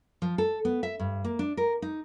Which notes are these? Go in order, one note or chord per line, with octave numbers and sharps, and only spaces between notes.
F3
A4
B3
E5
G2
A#3
D4
A#4
D#4